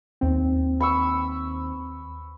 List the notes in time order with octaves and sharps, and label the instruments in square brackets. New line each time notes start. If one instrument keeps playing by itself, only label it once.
[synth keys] D#2 C4
[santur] B5 C#6 E6